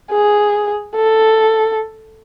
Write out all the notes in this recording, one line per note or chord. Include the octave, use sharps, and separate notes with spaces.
G#4
A4